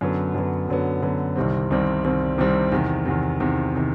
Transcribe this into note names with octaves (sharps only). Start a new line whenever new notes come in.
F#2 D3 F#3 B3
F#2 D3 F#3 B3
F#2 D3 F#3 B3
F#2 D3 F#3 B3
C2 C3 D#3 G3 C4
C2 C3 D#3 G3 C4
C2 C3 D#3 G3 C4
C2 C3 D#3 G3 C4
E2 C3 D#3
E2 C3 D#3
E2 C3 D#3
C3 D#3